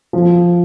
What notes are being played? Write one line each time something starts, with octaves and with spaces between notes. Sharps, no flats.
F3